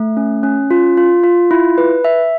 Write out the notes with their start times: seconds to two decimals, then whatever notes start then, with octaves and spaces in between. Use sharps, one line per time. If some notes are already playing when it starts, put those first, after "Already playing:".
Already playing: A3
0.17 C#4
0.43 C#4
0.71 F4
0.97 F4
1.24 F4
1.51 E4
1.78 B4
2.05 E5